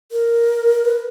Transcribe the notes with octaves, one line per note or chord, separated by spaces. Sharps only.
A#4
B4